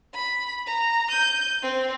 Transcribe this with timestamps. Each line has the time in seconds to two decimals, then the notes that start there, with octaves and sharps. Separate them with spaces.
0.14 B5
0.67 A#5
1.09 G6 D#7
1.63 C4